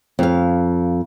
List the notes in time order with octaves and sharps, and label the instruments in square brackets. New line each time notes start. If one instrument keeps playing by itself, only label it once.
[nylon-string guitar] F2 F5